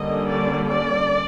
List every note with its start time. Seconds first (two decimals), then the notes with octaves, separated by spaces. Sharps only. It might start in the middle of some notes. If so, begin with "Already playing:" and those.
Already playing: D3 G3 A#3 C#4 D#5
0.28 D5
0.66 D5